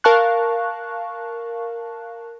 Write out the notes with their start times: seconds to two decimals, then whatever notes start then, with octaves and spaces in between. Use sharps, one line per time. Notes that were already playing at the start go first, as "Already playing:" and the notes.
0.04 A#4 F5 A5 C#6 F#6